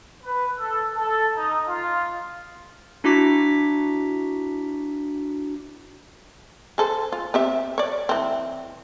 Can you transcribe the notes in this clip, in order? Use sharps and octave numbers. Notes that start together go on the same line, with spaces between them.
B4
A4
A4
D#4
F4
D4 E4 F#4 A#5 D6 B6
G#4 A4 C5
F4
C4 G4 E5
C#5 D5
E3 C4